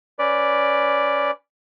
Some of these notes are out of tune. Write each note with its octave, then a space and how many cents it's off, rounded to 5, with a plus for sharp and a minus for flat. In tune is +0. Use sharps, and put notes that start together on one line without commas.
C#4 +5 B4 +0 D5 +0